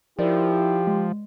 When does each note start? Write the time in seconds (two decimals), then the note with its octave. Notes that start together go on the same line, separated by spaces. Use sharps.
0.19 F3 D#4 E4 G4 A#4 D5
0.87 G#3